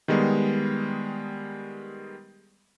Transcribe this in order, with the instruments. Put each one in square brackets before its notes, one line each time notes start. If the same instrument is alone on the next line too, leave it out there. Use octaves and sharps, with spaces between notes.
[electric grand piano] D#3 G3 G#3 B3